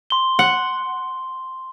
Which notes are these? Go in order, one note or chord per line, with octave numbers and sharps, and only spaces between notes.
C6 G7
F#5